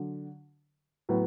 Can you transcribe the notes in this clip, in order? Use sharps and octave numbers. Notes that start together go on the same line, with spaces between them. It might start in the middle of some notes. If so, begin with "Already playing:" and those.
Already playing: D3 F#3
A2 F#3 B3